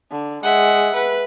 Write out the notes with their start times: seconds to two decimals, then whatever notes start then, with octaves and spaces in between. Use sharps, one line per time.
0.11 D3
0.43 G#3 E5 F#5
0.95 B4